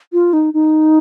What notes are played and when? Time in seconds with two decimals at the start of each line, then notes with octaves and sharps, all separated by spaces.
0.13 F4
0.33 D#4
0.54 D#4